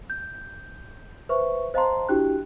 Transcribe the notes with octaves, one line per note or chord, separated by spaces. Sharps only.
G6
B4 C5 E5 C#6
C5 D#5 F5 A5 A#5 C6
D4 E4 F#4 G4 G5 F#6